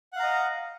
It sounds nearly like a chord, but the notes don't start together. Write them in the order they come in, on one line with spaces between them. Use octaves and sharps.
F#5 F5 A#5 D#5